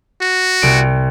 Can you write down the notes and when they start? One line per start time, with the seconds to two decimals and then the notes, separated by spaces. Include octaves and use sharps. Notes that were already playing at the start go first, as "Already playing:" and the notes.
0.21 F#4
0.62 C2 D7